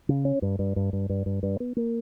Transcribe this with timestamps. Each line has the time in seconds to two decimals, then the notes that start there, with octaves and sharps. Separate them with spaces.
0.09 C#3
0.25 C#4
0.42 G2
0.59 G2
0.76 G2
0.93 G2
1.09 G2
1.26 G2
1.43 G2
1.60 B3
1.77 A#3